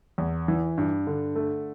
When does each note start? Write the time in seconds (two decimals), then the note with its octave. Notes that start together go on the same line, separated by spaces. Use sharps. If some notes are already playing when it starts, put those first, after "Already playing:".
0.18 E2
0.48 E3
0.78 G2
1.07 D3
1.35 A3